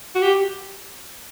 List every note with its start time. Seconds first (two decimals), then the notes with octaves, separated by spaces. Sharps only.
0.15 F#4
0.22 G4